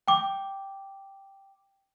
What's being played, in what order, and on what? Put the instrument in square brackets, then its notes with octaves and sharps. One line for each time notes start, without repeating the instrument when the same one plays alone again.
[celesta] G5 D6